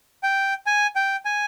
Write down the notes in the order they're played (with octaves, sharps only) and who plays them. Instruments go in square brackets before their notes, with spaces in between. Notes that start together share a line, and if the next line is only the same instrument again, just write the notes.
[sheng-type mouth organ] G5
G#5
G5
G#5